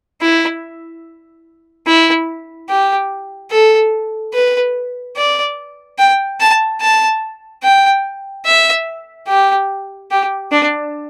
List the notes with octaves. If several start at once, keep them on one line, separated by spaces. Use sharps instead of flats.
E4
E4
G4
A4
B4
D5
G5
A5
A5
G5
E5
G4
G4
D4